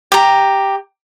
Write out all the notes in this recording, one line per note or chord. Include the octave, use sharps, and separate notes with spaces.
G4 A#5